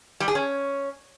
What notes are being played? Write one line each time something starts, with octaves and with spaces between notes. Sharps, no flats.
G3
G#4
C#4